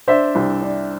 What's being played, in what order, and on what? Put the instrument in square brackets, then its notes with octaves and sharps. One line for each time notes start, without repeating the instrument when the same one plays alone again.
[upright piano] D4 C5 E5
C2
D4